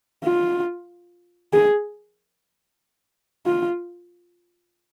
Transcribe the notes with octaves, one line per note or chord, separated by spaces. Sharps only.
F4
G#4
F4